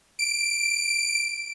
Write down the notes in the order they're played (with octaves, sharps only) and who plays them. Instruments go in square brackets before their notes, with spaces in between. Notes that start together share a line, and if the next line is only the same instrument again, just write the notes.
[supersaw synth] D7